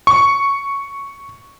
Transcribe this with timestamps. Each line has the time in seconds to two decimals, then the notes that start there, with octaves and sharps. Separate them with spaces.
0.07 C#6